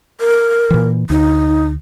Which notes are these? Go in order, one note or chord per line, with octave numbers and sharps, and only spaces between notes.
A#4
A#2 E3
D2 D#4